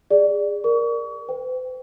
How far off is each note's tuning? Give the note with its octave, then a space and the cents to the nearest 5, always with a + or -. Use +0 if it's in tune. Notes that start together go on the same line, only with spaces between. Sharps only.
G#4 -20 D5 +5
A#4 +0 C#6 +35
C5 -45 G5 +0